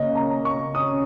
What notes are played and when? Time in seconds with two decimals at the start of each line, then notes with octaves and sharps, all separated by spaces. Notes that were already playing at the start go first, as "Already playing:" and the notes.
Already playing: C#3 A#3 C#4 D#5
0.15 A#5
0.45 C#6
0.74 C#4 D#6